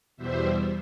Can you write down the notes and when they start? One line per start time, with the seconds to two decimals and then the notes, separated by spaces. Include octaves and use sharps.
0.17 E2 B2 G3 C5 E5